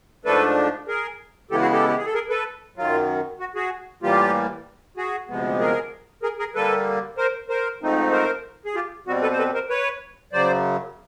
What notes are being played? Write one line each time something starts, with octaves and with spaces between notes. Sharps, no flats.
G#2 F3 A3 D4 A4 B4
G#4 A#4
C#3 E3 G#3 B3 E4 G4 A4
F#4 G#4
G4 A4
G4
G#4
A4
G#4 A#4
A4 B4
F#2 D#3 F#3 F4
F#4
F#4 G#4
A2 E3 G3 A#3 F4 G4
F#4 G#4
D2 C3 F3 G#3 B3
G#4 A#4
G#4 A#4
G#4 A#4
D3 G3 A#3 A4 B4
A#4 C5
A#4 C5
G#2 F3 A3 C4 D#4
A#4 C5
G#4
F4 G4
B2 G3 C4 F#4
A4 B4
C5
A4 B4
A#4 C5
B4 C#5
F#2 C#3 F#3 C5 D5